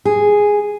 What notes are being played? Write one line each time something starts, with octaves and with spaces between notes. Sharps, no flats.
G#4